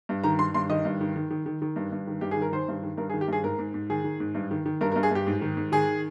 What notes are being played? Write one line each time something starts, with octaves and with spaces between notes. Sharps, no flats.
G2
D#3 A#5
D#3 C6
G2 C6
D#3 D#5
G2
D#3
D#3
D#3
D#3
D#3
G2
G2
D#3
G2 G4
G#4
D#3
A#4
D#3 C5
G2
D#3
G2 A#4
G#4
D#3
G4
G2 G#4
G#2 A#4
G#2
G#2
D#3 G#4
D#3
G#2
G2
D#3
D#3
G2 A#4
A#4
G2
G#4
G2 G4
G#2
D#3
G#2
D#3 G#4